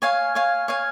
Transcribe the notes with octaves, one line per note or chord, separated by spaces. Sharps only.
C#5 F5 G#5
C#5 F5 G#5
C#5 F5 G#5